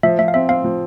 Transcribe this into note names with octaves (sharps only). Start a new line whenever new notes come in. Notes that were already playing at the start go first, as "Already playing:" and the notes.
F3 E5
F3 E5
F5
C4 E5
C4 F5
F3